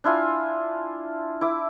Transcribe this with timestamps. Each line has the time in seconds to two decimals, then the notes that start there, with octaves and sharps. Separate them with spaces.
0.04 D4 E4 F4 G#5
1.41 E4 D6